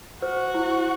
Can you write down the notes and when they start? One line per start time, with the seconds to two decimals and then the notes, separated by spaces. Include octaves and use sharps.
0.22 F#4 C5
0.54 E4